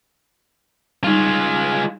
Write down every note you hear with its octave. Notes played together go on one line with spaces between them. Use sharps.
G3 G#3 D#4 F4